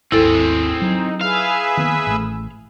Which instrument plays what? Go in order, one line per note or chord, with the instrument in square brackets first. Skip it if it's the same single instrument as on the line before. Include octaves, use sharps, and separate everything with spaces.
[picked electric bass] G#1 D#2 [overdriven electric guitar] C4 G#4 [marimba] E4 A4
[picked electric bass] F#3 [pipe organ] D#4
[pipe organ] G#4 B4 E5 [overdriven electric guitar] F5
[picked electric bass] D#3 A#3 B3
A1 A3